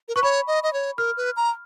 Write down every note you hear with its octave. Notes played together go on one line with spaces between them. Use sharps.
A#4
B4 C#6
C#5 B5
D#5
D#5
C#5
A#4 F6
B4
A#5